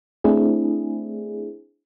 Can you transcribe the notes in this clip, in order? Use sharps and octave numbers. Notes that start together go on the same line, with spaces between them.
A3 C4 D4 E4 G#4